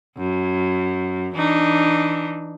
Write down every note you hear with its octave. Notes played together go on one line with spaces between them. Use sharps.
F#2
E3 D4 D#4